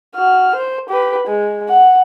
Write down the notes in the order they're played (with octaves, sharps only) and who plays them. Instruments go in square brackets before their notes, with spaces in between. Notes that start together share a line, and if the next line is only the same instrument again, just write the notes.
[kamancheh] F#4 F6
C5
G4 B4
G#3
F#5